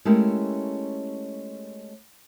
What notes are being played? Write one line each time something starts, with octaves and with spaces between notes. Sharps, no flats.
G#3 A3 C#4 E4 G4 A#4